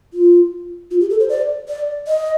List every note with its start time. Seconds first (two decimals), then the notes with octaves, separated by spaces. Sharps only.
0.14 F4
0.91 F4
1.00 G4
1.10 A4
1.20 C5
1.29 D5
1.68 D5
2.07 D#5